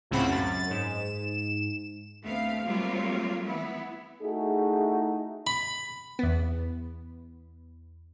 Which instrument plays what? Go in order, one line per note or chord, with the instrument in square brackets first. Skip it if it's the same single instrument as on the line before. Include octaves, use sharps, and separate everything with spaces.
[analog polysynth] C#2 A2 C#3 C4 F#5 B5
F#2 A6
G#2 E7
[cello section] D2 A3 B3 C4 F5
F#3 G3 A3 A#3 C4 F4
E3 B3 E4
[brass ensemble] A3 D#4 E4 F#4 G#4
[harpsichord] B5
[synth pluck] E2 B3